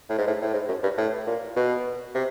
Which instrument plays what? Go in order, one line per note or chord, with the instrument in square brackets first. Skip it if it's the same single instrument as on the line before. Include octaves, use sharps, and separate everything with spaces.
[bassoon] A2
G#2
A2
A2
G#2
F#2
G2
A2
A#2
B2
C3